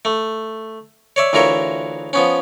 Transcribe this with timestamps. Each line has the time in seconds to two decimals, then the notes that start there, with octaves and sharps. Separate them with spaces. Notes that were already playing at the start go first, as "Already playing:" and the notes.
0.05 A3
1.16 C#5 D5 E5
1.33 D2 E3 F4 A#4 C#5 E5
2.13 F3 B3 C#4